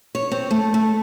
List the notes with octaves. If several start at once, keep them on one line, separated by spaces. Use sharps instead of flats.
C#5
C4
A3
A3